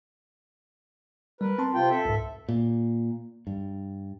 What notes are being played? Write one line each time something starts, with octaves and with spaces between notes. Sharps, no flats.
G3 A#4 B4
C4 A5 C6
C3 F4 G5
A4 E5
C2 G#2
A#2
G2